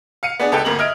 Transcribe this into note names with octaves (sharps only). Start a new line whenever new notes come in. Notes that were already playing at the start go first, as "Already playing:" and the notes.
F5 C#7 D#7
B3 D4 G#4 D5
C#2 A4 B4 G5
G1 D2 A#3 A#5 F#7
D#5 E5 F6 G#6 D7